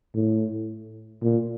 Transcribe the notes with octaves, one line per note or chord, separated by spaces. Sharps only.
A2
A#2